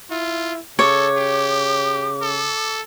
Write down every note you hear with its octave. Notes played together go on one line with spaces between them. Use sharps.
E4 F4
C#3 A4 C#5 D6
G4
A4